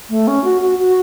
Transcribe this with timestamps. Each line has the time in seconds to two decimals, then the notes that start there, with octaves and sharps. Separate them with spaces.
0.09 A3
0.27 C#4
0.44 F#4
0.62 F#4
0.78 F#4